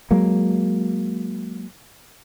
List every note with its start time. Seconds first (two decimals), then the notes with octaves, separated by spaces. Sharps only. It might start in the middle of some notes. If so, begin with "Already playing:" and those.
0.11 F#3 G#3 A#3